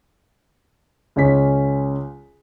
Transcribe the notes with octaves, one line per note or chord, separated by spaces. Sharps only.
C#2 C#4 B6